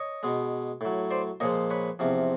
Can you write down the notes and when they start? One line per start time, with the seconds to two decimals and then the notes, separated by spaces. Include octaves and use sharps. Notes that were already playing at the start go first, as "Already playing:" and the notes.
Already playing: C#5 D#5
0.23 B2 G#3
0.81 A2 F#3
1.11 C5 D5
1.40 A#2 F3 G#3 C#5 D#5
1.70 B4 C#5
1.99 E2 C3 F3